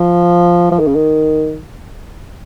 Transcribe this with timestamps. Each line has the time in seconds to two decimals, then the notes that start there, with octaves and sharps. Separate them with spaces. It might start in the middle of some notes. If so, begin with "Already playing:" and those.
Already playing: F3
0.71 F3
0.80 D#3
0.87 C#3
0.95 D#3